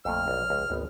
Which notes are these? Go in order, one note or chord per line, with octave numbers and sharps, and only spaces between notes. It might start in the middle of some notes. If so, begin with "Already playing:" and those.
A#1 F2 A#2 A3 F6
B1 D5
C#2
G#1 D2 B3 D#4